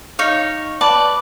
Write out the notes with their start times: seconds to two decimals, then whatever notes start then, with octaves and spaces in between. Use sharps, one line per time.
0.19 D#4 C#5 F5
0.81 B4 D5 A5